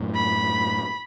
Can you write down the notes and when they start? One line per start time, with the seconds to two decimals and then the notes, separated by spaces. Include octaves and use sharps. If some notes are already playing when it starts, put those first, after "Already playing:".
Already playing: F#2 A2
0.15 B5